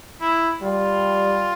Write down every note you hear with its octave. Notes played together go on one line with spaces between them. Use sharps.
E4
G3 F4